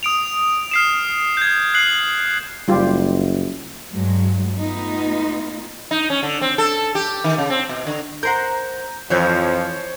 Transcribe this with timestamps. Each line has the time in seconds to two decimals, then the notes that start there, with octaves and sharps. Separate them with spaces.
0.03 D#6 D7 F7
0.71 F6 C7 E7
1.37 G6 G#6
1.74 F#6 C7 F#7
2.68 F#1 G3 F4 G4
3.92 G2 F#3 G#3
4.59 A3 B3 D#4 F4
5.91 D#4
6.10 C#4
6.23 D3
6.41 C4
6.58 A4
6.95 G4
7.24 D#3
7.38 C#3
7.50 C4
7.69 B2
7.87 D3
8.23 A#4 C5 F#5 A#5 G6
9.10 F2 E3 F3 C5 C#5 G6